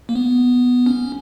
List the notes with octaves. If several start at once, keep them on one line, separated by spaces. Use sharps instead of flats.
A#3
B3
C#4